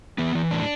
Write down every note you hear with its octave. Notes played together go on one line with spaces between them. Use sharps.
E3 B3
E3
A2 D4